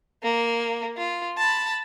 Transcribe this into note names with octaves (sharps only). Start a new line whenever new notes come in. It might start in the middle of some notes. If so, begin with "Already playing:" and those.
A#3
F4
A5 B5